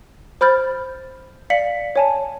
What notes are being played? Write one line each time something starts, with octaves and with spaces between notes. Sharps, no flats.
C5 B5 F6 G6 A6
D5 F5 B6 C#7 F#7
C#5 G#5 A5